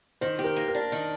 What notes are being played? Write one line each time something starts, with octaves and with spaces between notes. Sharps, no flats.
D#3 C5
G4
A#4
A#3
A#4
D4
D#3